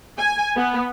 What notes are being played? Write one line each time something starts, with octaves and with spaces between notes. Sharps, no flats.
G#5
B3